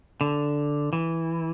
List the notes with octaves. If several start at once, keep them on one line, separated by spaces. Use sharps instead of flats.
D3
E3